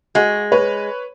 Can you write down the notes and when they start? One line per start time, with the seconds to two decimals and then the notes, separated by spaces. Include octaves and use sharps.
0.15 G#3 F#4
0.52 B4 C#5